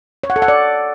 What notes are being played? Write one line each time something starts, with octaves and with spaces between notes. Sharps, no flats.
C#5
F#5
A4
F#5
D5